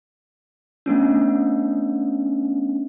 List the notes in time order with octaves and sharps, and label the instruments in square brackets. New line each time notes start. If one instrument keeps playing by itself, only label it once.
[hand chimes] A3 B3 C#4 D4